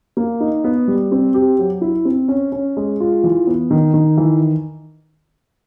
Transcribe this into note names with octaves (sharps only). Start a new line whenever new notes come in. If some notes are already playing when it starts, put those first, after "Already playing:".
A#3
D#4
B3
G3
C4
G4
F#3
E4
C4
C#4
C#4
G#3
F4
E3
B3
D#3
D#3
E3